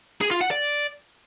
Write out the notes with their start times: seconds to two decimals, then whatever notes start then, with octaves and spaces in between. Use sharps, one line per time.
0.21 G#4
0.31 F4
0.41 F#5
0.51 D5